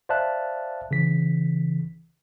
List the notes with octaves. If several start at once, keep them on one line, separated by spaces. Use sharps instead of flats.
C5 D5 E5 F5 A5 F#6
C#3 E3 B6